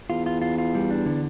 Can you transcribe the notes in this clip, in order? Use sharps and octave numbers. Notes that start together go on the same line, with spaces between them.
E2 F4
F4
F4
F4
G3
D4
D3